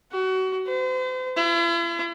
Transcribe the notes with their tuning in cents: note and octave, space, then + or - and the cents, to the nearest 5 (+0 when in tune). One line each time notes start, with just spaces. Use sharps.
F#4 +25
C5 -40
E4 +45